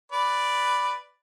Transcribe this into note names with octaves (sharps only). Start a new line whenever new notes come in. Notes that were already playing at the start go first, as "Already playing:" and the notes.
B4 D5